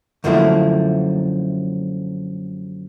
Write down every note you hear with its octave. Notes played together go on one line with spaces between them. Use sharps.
F#2 D3 F3 A3 A#3 E4